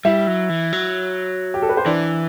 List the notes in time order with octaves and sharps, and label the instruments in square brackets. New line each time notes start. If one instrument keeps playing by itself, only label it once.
[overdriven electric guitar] G3 [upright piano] E4 E5
[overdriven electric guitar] F#3
E3
F#3
[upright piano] G4
A4
B4
C5
[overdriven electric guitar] E3 [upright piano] D4 D5